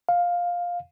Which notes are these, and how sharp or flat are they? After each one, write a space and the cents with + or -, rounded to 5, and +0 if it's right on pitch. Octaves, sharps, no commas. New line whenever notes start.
F5 +10